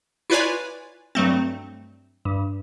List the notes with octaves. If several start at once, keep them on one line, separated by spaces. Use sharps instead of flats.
E4 F4 B4 C#5 D5 G#5
G2 F#3 A3 C4
G2